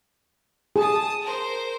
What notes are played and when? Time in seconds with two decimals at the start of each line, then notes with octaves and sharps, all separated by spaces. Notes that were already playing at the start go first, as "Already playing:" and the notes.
0.76 G#4 A5 D#6
1.22 A#4 C5